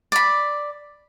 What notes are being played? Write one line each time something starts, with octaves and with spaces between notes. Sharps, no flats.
D5 B5